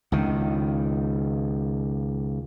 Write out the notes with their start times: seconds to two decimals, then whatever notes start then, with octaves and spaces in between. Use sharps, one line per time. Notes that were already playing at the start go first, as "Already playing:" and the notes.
0.12 C#2 D#3